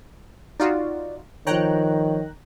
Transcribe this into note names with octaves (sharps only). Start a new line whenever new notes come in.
D#4 F4 F#4 D5
D#3 F3 C#5 G5 A#5 F#6